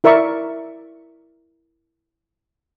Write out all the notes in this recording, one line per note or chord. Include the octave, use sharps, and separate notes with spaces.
E4 A#4 D5 E5 C#6